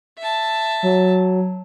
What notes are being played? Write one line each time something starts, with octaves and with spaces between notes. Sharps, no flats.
E5 A5
F#3